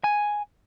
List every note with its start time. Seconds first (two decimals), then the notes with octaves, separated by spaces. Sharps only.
0.04 G#5